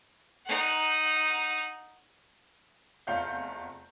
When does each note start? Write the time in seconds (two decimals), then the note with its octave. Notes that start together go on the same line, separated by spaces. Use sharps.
0.46 D#4 F#5
3.07 F1 E2 F4 F5 F#5 G6